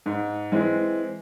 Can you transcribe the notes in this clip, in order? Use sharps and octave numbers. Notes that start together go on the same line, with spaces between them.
G#2
E3 G#3 C4